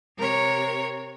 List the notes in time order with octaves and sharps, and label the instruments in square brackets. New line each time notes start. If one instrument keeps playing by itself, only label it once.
[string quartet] C3 A#4 C#5